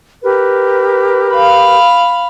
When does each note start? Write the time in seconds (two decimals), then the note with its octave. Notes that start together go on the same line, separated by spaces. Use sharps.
0.22 G4 A#4 B4
1.34 F5 B5